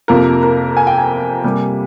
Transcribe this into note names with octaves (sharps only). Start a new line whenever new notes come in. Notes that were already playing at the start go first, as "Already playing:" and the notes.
F2 C3 F3 A#3 A#4
A#4
G#5
G5
G#5
C3 G3 A#3